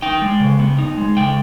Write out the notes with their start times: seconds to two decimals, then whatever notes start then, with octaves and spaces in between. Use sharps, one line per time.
0.02 D#4 G5
0.22 G#3
0.40 C#3
0.59 B3
0.79 D#4
0.97 G#3
1.16 C#3 G5